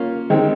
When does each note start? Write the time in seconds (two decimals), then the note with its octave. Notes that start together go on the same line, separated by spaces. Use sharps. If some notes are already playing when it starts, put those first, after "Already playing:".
Already playing: A#3 C#4 F4
0.30 D#3 G#3 C4 D#4